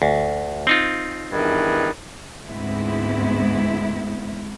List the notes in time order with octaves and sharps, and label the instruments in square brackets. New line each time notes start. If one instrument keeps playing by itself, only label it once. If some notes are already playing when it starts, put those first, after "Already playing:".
[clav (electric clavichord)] D2
C4 D#4 F4
[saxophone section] E2 G2 D#3
[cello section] D2 G#2 G#3 B3 C4 E4